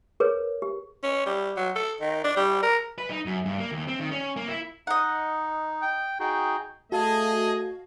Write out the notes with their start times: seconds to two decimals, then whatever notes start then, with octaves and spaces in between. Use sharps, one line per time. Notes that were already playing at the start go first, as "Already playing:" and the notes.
0.20 G#4 A#4 B4 C#5
0.62 G4
1.03 C#4
1.26 G3
1.57 F#3
1.76 A4
2.01 D#3
2.24 D4
2.37 G3
2.63 A#4
2.98 B4
3.10 D#4
3.26 F#2
3.46 G2
3.58 A#3
3.72 D#2
3.87 C4
3.99 D#3
4.11 C#4
4.36 A#3
4.48 E4
4.87 D#4 D#5 F#5
5.82 G5
6.20 D#4 F#4 G#4 G5
6.92 A3 F#4 G#4 D#5 F5 A5